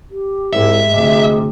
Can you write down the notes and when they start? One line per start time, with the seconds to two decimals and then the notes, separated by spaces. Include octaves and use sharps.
0.11 G4
0.53 C2 G#2 G#3 E5
0.91 D2 C3 G#3 G#4